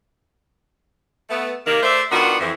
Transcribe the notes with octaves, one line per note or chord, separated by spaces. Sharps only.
A3 B3
C3 D#3 A#3
A3 C5 D5 E5
D#3 B3 D4 F4 F#4
F2 E3